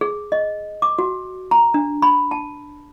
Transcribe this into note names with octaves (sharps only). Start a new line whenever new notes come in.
G#4
D#5
D6
F#4
A#5
D4
B5
A5